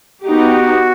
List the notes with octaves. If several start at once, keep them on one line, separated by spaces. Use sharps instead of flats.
B3 D#4 F#4 G4